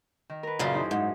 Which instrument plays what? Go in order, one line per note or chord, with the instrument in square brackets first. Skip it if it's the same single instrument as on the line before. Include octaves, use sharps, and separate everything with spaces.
[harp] D#3
A#4 B4
[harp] F#2 G#4 A5 [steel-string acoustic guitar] A#2 C#3 F4
[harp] D#4 E4 C5
[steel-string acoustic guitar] G#2